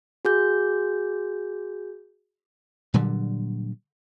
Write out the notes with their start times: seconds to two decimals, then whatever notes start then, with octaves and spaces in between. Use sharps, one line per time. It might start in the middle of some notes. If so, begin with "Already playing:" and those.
0.25 F#4 G#4 G6
2.94 A#2 D3 F#3 G3